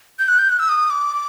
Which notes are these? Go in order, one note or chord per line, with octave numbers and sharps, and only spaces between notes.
G6
F#6
G6
F#6
E6
D#6
D6